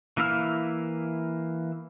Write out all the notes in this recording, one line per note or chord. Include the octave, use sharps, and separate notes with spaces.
E3 A#3 E4 F5 E6